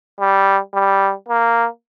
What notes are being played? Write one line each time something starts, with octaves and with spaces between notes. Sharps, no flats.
G3
G3
A#3